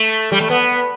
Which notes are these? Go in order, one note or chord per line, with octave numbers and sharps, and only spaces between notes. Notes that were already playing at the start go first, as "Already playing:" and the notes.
Already playing: A3
G3
A3
B3